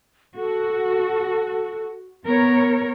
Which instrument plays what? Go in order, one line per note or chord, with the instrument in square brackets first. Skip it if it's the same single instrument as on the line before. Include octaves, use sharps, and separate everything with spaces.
[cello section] F#4 [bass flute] A4
[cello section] B3 A#4 C#5